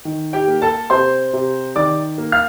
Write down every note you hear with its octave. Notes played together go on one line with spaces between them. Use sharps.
D#3
G4 G5
A#3
A4 A5
C3 C5 C6
C3
D#3 D5 D6
A#3
F5 F6